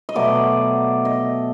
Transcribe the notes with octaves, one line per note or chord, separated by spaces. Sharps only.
D#5
B2 F#3 A3 D5
D#5